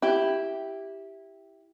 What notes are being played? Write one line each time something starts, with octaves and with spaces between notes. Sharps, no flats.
E4 G4